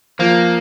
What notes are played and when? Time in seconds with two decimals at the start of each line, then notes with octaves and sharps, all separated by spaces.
0.19 F3 A#3